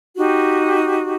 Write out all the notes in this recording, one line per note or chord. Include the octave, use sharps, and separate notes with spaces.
D#4 F#4 G4